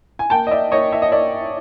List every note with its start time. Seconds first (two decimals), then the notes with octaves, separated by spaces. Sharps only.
0.19 G#5
0.30 A#3 G5 A5
0.47 D#5
0.51 D5 E5
0.71 A#3 C#5 D#5
0.93 E5
1.02 D#5
1.12 A#3 D5 E5